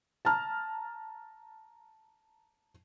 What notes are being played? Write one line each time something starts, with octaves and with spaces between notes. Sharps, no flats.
A5 A#5 F6